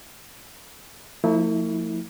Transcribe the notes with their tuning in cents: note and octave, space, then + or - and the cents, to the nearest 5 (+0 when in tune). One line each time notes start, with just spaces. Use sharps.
F3 +0 A3 +45 E4 -30